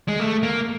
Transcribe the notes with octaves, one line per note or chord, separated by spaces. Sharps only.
G#3
A3
A#3